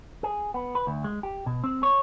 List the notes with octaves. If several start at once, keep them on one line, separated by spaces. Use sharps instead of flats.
G#4
B3
B4
D2
G#3
G4
B2
C4
C#5